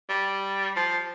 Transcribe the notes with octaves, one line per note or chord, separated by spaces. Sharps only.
G3
F3